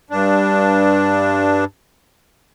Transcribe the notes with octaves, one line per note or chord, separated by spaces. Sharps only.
G2 D4